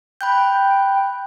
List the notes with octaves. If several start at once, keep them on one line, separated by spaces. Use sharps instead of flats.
G5 B5 F#6 G6